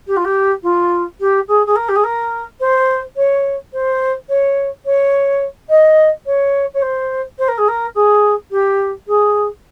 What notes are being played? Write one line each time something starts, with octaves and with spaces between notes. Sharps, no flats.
G4
F4
G4
F4
G4
G#4
G#4
A#4
G4
G#4
A#4
C5
C#5
C5
C#5
C#5
D#5
C#5
C#5
C5
C5
A#4
G#4
A#4
G#4
G4
G#4